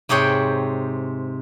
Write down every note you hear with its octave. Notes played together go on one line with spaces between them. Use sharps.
G#2 C3 G#4 C#5 G5